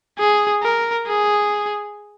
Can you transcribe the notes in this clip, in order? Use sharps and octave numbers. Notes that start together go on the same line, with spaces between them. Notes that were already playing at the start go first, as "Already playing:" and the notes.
G#4
A#4
G#4